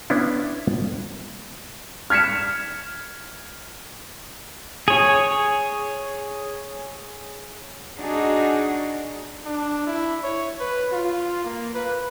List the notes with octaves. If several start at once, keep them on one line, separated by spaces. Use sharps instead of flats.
B3 C#4 D4 E4
F6 G#6 B6 C#7 E7
G#4 C#5
D4 D#4 F#4 G#4
D4
E4
C#5
B4
F4
A#3
B4